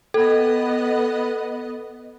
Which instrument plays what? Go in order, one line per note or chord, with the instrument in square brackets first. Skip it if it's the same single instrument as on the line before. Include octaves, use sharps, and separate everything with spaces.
[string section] B3 D#5 [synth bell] A4